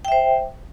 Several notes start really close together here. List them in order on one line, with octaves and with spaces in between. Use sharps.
G5 E5 C5